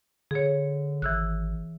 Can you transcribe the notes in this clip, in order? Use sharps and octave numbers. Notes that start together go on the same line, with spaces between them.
D3 G#4 C#5
G#1 E3 E6 F#6